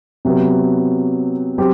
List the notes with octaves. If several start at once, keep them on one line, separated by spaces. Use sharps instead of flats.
C3 F#3 B3
F#3 C4 G4